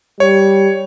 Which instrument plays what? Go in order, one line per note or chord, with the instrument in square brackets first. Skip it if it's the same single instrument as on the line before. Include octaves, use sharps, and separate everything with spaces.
[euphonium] G3 [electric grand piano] C#5